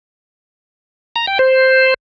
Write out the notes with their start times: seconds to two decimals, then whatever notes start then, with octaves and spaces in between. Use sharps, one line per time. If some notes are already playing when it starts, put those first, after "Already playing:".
1.16 A#5
1.27 G5
1.39 C5